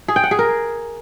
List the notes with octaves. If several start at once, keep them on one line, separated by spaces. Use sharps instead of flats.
G#4
G5
F#5
G#4
A#4